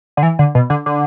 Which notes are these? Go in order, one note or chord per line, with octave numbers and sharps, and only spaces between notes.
D3
E3
D3
B2
D3
D3